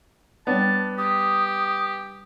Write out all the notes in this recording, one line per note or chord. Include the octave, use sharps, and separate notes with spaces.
G3 B3 D4 B4 C#5 A5
G4 D#6